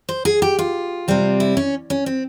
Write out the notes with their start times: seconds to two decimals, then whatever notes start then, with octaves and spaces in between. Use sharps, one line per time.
0.09 C5
0.25 G#4
0.42 G4
0.59 F4
1.08 C3 G3 C4
1.40 E4
1.57 C#4
1.90 C#4
2.06 C4